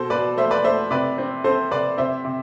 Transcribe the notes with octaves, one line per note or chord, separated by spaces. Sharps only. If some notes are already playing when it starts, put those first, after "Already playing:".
Already playing: B2 A4 C5
B2 B4 D5
A3 C5 E5
B4 D5
A3 C5 E5
C3 B4 D5
C4
C4 A4 C5
C3 B4 D5
C3 C5 E5
C3